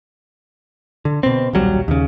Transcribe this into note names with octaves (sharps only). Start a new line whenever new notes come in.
D3
B2 C4
D#1 B1 F#3 G3
D#2 C#3